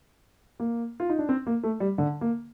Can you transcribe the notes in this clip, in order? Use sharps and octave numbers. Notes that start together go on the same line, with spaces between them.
A#3
F4
D#4
D4
C4
A#3
A3
G3
D3
A#3